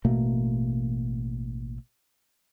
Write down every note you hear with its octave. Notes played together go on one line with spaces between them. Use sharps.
A1 B2 A3 A#3